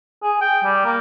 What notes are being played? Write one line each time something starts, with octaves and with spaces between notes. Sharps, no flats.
G#4
G5
G3
A#3